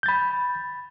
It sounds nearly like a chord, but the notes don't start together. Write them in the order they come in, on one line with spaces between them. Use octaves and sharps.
G6 A6 B5